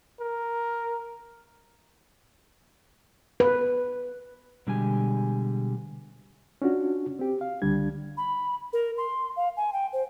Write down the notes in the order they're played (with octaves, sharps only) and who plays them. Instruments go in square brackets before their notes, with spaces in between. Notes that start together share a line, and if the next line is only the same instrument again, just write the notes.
[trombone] A#4
[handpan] B4
[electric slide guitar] B2 D3 G3 G#3 G4 G#5
[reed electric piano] C#4 D4 F4 F#4
C4 G4
F5
C#2 D3 G3 D4 G#6
[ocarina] B5
A#4
C6
F5
G#5
G5
C5